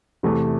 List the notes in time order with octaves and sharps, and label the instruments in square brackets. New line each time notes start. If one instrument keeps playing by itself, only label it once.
[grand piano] E2 C3 E3 A3